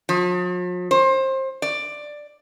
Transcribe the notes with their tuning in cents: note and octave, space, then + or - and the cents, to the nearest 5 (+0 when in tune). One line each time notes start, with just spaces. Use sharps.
F3 +45
C5 +25
D5 +10